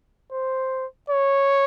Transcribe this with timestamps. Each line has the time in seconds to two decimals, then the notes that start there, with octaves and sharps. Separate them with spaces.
0.31 C5
1.10 C#5